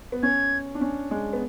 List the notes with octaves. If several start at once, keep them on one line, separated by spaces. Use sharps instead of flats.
B3
C#4 G#6
D4
C#4
G#3
B3